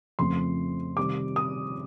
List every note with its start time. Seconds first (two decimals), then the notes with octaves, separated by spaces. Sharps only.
0.19 F2 C#3 F3 A3 C4 C6
0.97 C3 D#3 G3 D6
1.36 D#6